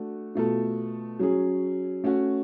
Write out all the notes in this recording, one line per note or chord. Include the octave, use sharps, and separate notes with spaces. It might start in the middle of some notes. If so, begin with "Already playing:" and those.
Already playing: A3 D4 F#4
B2 A3 F4 A4
F#3 C#4 G#4
A3 C#4 F#4